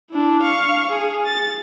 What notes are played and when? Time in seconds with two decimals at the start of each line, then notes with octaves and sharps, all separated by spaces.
0.11 D4 E4
0.42 F5 C#6
0.91 G#4 G#5
1.25 A6